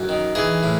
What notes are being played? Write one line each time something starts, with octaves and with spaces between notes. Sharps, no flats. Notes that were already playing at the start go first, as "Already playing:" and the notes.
Already playing: F#2
D#3
E3 G#4
A2